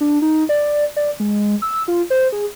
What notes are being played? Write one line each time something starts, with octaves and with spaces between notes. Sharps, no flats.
D4
D#4
D5
D5
G#3
E6
F4
C5
G#4